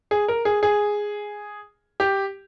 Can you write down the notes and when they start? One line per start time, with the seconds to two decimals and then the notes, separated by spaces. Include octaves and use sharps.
0.11 G#4
0.28 A#4
0.45 G#4
0.63 G#4
2.00 G4